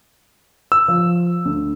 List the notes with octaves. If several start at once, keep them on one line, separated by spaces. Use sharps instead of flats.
E6
F3
D2